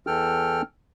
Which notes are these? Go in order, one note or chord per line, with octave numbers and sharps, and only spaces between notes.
E2 E3 A4 G5 F6